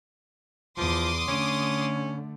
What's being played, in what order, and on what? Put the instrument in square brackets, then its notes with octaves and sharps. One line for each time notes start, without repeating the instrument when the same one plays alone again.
[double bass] E2 [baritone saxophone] F3 [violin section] C6 D6 D#6
[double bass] D3 A3 [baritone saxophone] C#4